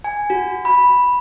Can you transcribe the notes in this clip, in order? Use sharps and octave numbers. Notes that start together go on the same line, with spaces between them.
G#5
F#4
B5